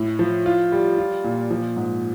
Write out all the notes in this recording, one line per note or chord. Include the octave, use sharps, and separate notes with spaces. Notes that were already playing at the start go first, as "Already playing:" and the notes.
Already playing: A2
F3
F4
G3
F4
A#2
F3
G#2